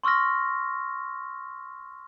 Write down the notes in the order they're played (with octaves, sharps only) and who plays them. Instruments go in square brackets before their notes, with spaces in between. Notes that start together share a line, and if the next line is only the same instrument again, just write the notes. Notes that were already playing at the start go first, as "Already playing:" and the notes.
[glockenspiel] C6 C#6 E6 F6 A#6